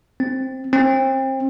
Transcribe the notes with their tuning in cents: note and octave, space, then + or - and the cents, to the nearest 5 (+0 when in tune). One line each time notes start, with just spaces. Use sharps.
C4 +5
C4 +30